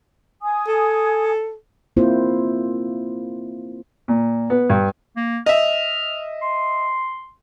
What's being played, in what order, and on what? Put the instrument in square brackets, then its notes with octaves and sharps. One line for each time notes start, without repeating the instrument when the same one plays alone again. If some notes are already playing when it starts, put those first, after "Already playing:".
[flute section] G#5 D#6
[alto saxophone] A4
[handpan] A#3 C4 E4 F4 C5
[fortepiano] A#2
B3
G2
[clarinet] A#3
[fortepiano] D#5 E5 [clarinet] F6
[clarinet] C6